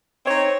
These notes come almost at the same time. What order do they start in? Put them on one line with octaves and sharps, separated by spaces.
C4 C#5 D#4